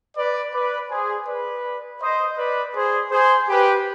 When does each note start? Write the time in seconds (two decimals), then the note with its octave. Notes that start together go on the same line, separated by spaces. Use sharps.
0.17 B4 D5
0.54 B4 D5
0.91 G#4 C5
1.27 B4 D5
2.01 C5 D#5
2.38 B4 D5
2.75 G#4 C5
3.11 G#4 C5
3.48 G4 B4